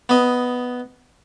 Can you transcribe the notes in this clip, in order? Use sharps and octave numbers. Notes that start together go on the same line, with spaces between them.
B3 D#5